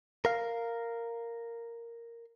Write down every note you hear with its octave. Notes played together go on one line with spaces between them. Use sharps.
A#4 F5